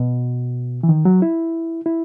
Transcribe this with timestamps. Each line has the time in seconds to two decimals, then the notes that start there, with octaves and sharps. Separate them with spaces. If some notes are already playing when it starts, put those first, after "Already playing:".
Already playing: B2
0.83 E3
0.89 D#3
1.05 F#3
1.22 E4
1.86 E4